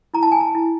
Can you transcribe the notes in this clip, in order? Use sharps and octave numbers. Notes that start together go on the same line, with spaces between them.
E4 A#5
A5
G#5
A5
E4